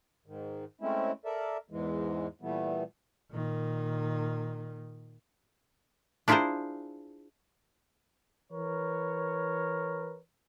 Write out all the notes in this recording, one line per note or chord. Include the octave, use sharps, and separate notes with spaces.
G#2 D#3
G#3 A3 C4 C#4 E4
A4 A#4 D5 E5
E2 G#2 E3 G#3
A#2 E3 G3 A3 B3
A#2 D#3
D4 E4 F4 G#4 A#4 C5
E3 A#4 B4 C#5